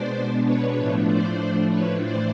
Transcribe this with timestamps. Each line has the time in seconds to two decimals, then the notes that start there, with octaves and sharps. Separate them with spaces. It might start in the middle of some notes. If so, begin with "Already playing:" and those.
Already playing: B2 G#3 B3 D4 C5 D5
0.45 B4 C#5
0.76 A2 F3 A3 D4
1.07 C5 D5
1.70 B4 C#5
2.01 A2 E3 C5 D5